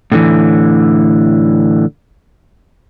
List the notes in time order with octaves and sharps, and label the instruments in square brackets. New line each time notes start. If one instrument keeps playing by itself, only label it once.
[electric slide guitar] A2 D3 E3